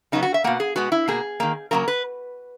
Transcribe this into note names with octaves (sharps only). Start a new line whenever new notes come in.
C#3 F#3 B3 D#4
F#4
E5
B2 A#3 F#5
G#4
B2 G#3 B3 F#4
E4
B2 A#3 G#4
D#3 A#3
C#3 F#3 A#3 A#4
B4